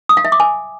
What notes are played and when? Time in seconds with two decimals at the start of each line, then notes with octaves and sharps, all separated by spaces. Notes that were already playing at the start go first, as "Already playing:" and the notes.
0.09 D#6
0.17 F5
0.25 E5
0.32 D6
0.40 G#5